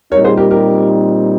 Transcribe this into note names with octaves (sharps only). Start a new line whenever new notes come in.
A#2 G3 C4 D#4 A#4 C#5
G#4 C5
G4 A#4
G4 A#4